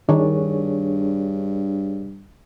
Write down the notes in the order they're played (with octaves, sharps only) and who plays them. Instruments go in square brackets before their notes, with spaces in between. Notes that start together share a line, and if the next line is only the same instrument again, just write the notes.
[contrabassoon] G2 [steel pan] D#3 [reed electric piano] D4 G#4 C#5